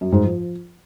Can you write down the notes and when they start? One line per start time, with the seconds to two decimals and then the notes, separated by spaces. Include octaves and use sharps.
0.01 F#2
0.12 G#2
0.23 F3